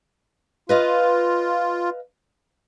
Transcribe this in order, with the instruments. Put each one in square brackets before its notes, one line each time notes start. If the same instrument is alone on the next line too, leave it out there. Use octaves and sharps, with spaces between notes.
[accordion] F4 [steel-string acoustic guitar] B4 D#5 F5